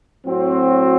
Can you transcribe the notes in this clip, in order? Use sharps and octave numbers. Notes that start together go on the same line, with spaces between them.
A2 F#3 C4 F#4 C5